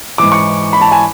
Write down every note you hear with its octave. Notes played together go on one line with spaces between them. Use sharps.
G#2 E3 D6
C#6
B5
A5
G#5